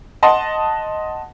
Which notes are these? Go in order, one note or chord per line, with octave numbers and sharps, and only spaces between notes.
D#5 F#5 A5 C6